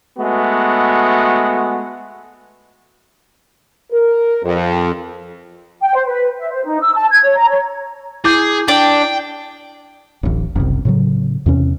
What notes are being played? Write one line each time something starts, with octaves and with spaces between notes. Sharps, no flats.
G#3 A3 B3 F#4
A#4
F2
G5
C5
B4
E5
C5
D#4
E6
A5
G#6
C#5
A#5
C#5
E4 G#4 D6 G6
D4 G5
D1 A1
F#1 C2
A2 C#3 F#3
E2 C3 C#4